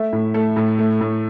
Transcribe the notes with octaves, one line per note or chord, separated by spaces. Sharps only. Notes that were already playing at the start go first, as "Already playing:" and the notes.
Already playing: A3 E5
A2
A3 A4
A2
A3
A2